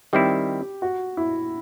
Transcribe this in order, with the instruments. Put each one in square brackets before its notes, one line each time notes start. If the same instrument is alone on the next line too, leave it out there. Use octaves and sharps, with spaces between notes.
[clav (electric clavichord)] D#3 G3 C4 E4 [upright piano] G4
[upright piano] F#4
E4